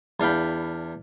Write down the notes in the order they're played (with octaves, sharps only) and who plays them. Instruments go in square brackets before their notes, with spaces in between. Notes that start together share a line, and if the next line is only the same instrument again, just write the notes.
[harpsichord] E2 D4 F5 G5 B5